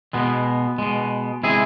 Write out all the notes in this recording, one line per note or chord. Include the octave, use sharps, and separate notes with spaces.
B2 G#3 B3
B2 G#3
C3 G#3 E4 G#4